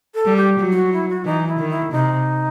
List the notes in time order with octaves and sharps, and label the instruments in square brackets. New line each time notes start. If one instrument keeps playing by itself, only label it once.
[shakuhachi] A4
[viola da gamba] G3
[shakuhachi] G4
[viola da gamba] F#3
[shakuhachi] E4
F#4
E4
F#4
[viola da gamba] E3 [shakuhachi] D#4
[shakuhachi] E4
[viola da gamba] D#3
[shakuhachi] E4
[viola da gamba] C3 [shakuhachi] D#4